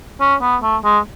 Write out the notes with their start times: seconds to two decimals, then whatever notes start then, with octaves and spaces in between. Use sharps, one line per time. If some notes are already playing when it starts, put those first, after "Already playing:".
0.20 C#4
0.42 B3
0.62 A3
0.84 G#3